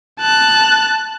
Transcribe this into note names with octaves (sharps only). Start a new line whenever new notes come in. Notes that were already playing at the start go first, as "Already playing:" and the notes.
A5 F#6